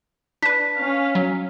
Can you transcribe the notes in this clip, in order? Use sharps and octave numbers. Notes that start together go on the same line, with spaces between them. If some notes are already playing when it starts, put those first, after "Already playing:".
D4 B4 B6
C#4 F5
F#3